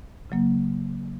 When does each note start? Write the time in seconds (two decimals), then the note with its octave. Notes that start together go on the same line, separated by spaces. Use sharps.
0.30 C#3 F#3 A#3